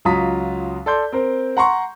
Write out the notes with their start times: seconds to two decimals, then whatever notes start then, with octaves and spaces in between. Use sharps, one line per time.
0.05 C#2 F#3 F4 A#5 D#6 B6
0.86 A4 D5 C6 G6
1.12 C4 A#4 C5
1.57 F#5 A#5 C6 C#6